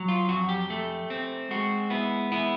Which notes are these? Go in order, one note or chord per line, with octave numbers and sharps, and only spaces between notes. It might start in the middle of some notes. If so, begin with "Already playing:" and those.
Already playing: F#3
F4
F2 F#4
G4
A3
C4
G#3 F#4
B3 E4
B3 E4